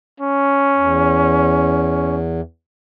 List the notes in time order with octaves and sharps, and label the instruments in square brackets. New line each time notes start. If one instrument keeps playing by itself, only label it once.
[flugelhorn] C#4
[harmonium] E2